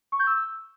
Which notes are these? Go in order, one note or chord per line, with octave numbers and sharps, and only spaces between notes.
C#6
G6
E6